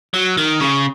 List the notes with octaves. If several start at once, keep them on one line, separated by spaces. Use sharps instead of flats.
F#3
D#3
C#3